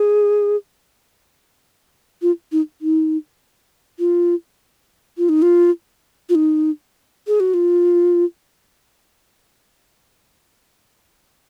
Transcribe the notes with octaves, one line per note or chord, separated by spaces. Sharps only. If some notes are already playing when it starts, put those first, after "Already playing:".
Already playing: G#4
F4
D#4
D#4
F4
F4
D#4
F4
F4
D#4
G#4
F#4
F4